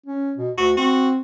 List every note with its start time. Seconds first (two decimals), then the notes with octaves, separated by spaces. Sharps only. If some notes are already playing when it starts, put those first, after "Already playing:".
0.06 C#4
0.37 B2
0.58 D2 F#4
0.77 C4 F#4